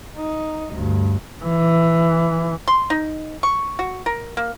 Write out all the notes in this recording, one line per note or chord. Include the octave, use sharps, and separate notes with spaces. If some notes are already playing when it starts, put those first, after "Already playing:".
D#4
D2 G2
E3
C6
D#4
C#6
F#4
A#4
A#3